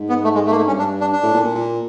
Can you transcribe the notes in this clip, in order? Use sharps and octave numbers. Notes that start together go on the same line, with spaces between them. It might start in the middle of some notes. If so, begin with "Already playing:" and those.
Already playing: G#2
B3
A3
G#3
A3
A#3
A3
G2 C#4
D4
D4
D4
A2
A#2
A#2
A#2